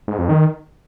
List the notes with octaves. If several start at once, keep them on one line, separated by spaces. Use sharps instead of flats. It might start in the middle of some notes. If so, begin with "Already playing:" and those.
G#2
F2
D#3